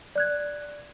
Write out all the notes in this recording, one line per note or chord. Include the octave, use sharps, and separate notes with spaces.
D5 F#6 G#6